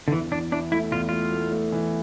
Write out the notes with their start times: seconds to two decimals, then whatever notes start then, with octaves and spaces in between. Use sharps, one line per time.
0.08 D3
0.12 E2 E3
0.31 E2 D4
0.52 E3 D4
0.72 A3 E4
0.91 E2 F4
1.09 A3 F4
1.32 A3
1.51 A3
1.72 E3